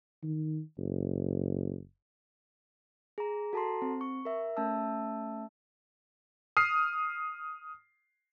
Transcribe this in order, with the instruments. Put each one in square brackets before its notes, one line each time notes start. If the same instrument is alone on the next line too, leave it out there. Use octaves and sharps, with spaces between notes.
[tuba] D#3
F#1
[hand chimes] G#4 A#5
F#4 A4 A5 A#5 C6
C4
C#6
A#4 E5
A3 C#4 E5 A5 E6
[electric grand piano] D#6 F6 C7